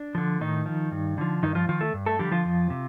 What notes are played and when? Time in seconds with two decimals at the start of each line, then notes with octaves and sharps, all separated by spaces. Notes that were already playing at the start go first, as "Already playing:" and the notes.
Already playing: D4
0.15 D3 F3
0.41 A2 D#3 D#4
0.66 F3
0.91 G2
1.18 D3 F3
1.43 G2 D#3 D#4
1.55 F3 F4
1.69 D#3 F3 F4
1.81 A3 A4
1.94 G2
2.06 A3 A4
2.19 D3 F3 G3 G4
2.32 F3 F4
2.45 F2
2.70 C3